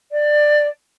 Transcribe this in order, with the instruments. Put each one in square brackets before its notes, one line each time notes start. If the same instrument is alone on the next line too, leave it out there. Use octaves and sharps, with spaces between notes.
[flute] D5